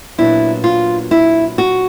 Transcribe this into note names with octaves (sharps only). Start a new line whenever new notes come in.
A#2 F#3 B3 D4 E4
F4
E4
F#4